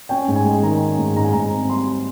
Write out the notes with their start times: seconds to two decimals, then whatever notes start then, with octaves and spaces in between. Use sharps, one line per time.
0.09 C#4 G5
0.28 G#2
0.36 G#5
0.45 G#3
0.63 D#3 A#5
0.81 C#4
0.98 G#2
1.16 G#2 A#5
1.24 G#5
1.33 G#2 A#5
1.52 C4
1.69 G3 C6